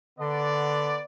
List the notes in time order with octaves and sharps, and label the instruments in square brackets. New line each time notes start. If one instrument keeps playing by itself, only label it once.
[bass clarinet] D3 [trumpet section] B3 D5